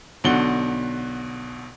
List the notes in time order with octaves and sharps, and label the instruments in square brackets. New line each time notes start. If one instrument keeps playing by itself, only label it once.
[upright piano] B1 B2 D3 F#5 G7